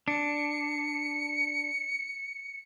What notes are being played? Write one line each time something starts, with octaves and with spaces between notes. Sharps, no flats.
D4 C#7